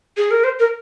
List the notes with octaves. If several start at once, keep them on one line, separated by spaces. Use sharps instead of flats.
G#4
A#4
C5
A#4